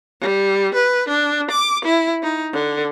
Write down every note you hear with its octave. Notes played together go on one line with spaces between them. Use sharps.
G3
B4
D4
D6
E4
D#4
D3